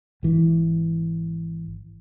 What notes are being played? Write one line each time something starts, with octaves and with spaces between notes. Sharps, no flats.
G#1 E3